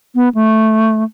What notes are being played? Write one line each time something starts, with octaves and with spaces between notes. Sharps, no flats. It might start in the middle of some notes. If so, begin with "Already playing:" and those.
B3
A3